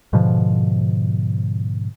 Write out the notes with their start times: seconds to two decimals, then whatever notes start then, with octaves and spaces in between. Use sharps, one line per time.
0.13 G#2 B2 D3 F3